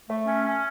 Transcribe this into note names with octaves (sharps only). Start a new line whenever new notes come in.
A3
C#4
C#4